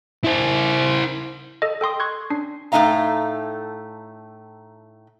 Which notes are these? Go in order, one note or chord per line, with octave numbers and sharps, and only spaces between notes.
E4 C5
A4 D#5
A4 G5 C6 D#6
C6 C#6 F#6 G#6
C#4 D4 C7
A2 A3 C#4 D#4 F5 A#5